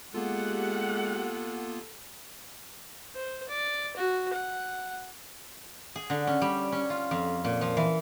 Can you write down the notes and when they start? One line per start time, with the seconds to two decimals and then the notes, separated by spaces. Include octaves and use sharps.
0.14 G#3 A#3 B3 F4 G4 A4 F#5
3.15 C5
3.49 D5
3.96 F#4
4.33 F#5
5.96 G#4
6.10 D3
6.27 C#4
6.42 G3
6.72 C#4
6.90 F4
7.11 F2
7.44 A#2
7.61 F3
7.77 E3